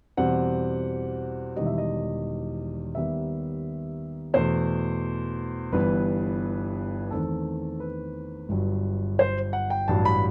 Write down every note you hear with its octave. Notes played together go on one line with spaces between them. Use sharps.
E2 B2 G3 C4 F#5
E1 E2 D#3 G3 D#5
E5
D#5
D#2 D#3 G3 B3 E5
E2 B2 A3 C5
G1 G2 E3 B3 B4
E2 D#3 A3 C4 A4
B4
G1 G2 F#3
C5
F#5
G5
A1 G2 F#3 A5
B5